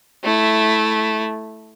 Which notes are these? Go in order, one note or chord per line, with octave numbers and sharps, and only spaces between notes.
A3 E4